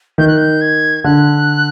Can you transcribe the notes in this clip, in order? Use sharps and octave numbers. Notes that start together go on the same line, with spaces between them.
D#3 G6
F#6
G6
G#6
D3 F#6